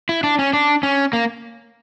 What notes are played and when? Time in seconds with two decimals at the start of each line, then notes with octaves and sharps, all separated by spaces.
0.09 E4
0.24 D4
0.39 C#4
0.53 D4
0.83 C#4
1.13 A#3